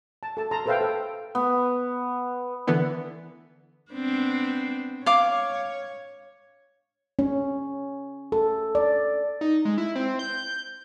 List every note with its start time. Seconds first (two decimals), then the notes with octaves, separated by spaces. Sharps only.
0.23 A5
0.37 A4 A5
0.51 A5 A#5 C6 D#6
0.66 A4 B4 C5 E5 F5 G5
0.81 A4
1.35 B3
2.67 D3 E3 B3
3.92 B3 C4 D4
5.06 C#5 F5 D6
7.19 C#4
8.32 A4
8.75 D5
9.41 D#4
9.65 G#3
9.78 E4
9.95 C4
10.19 G6